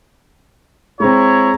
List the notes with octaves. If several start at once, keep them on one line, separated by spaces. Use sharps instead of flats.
G#3 C4 E4 C#5 A#5